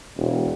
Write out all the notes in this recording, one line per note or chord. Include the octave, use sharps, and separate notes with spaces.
E1